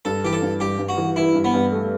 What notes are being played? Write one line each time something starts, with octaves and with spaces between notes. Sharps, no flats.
G2 A4
E3 G4
A4
G2
G2 G4
G2
F#4
E3
E3 E4
G2
B3
G2
A3